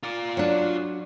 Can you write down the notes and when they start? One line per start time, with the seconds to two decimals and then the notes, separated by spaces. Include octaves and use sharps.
0.03 F4 D5
0.37 F#3 D4